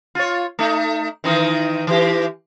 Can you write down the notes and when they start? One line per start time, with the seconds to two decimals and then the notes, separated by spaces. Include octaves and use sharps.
0.15 F4 C#5
0.59 A3 D#4
1.24 D#3 E3 D#4
1.87 E3 G4